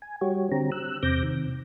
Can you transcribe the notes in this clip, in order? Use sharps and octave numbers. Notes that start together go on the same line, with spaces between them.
G#5
G3 F#4 G4 C#5
D3 C4 G4 A#5
E6 F#6
E2 C3 C4 D6 G6 A#6
C3 D#3